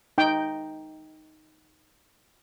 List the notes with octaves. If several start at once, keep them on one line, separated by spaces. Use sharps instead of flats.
D#4 G5